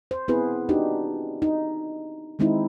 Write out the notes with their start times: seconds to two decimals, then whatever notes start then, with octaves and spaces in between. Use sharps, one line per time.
0.11 C5
0.28 B3 C4 E4 G#4 B4
0.69 D4 D#4 F#4 G4
1.42 D#4
2.39 D#3 G#3 C4 D#4 E4